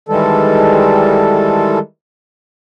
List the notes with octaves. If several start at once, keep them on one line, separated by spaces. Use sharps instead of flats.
D#3 E3 G3 G#3 A4